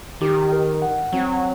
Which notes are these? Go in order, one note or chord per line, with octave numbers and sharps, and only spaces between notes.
D#3 G4
A#4
F#5
F#3 C4